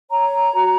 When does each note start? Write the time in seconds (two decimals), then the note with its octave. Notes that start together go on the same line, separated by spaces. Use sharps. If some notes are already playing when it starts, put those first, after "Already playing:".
0.11 C#5 A#5
0.54 F#4